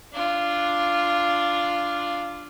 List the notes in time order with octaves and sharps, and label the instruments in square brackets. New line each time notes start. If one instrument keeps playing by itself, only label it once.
[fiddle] D4 F4